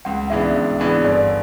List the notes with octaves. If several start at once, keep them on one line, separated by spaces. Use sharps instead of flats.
C#2 F#5
C#3 E3 B3 D4 E5
C#2 E5
C#3 E3 B3 D4
G1 D5